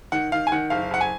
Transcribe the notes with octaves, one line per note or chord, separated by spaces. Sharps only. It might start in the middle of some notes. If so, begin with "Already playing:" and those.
D#3 F#5
D#3 F5
G#5
D#3 F#5
F#1 F5
F#1 F#5
G#5